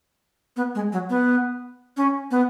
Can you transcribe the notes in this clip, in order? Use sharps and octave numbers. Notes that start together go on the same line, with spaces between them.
B3
G#3
F#3
B3
C#4
B3